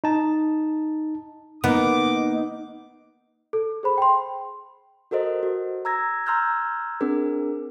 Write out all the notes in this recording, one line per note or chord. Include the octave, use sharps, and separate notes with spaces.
D#4 A5
A#3 B3 D#4 D6
A4
G#4 C5 B5
G5 C6
F#4 A4 A#4 C5 D#5
F#4
A#5 E6 G#6 A#6
A#5 C6 E6 F6 G6 G#6
C4 D4 G#4 A#4